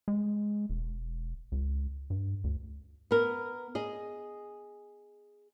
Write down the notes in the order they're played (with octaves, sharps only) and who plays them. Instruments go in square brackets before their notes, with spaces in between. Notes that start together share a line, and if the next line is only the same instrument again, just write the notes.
[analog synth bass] G#3
E1
C#2
G2
D2
[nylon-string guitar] B3 A#4
G#4 D#5